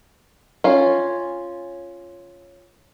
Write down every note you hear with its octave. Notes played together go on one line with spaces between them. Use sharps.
C#4 F4